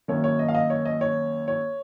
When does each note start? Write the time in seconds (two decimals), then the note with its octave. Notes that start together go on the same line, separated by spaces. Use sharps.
0.08 F#2 D#3 A#3 C#5
0.24 C#5
0.39 D#5
0.48 F5
0.55 D#5
0.70 C#5
0.85 D#5
1.01 C#5
1.48 C#5